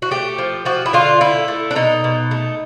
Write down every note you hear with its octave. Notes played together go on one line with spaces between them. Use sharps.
F#4
A3 G4
F3
F3 F#4
E4
D3 F4
A3 E4
A3
D4
B2 D#4
B2
A3